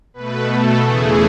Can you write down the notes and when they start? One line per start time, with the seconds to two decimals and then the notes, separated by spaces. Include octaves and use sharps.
0.14 B2 A3 B4
0.49 A4
0.83 E2 C#3 E3 A3 G#4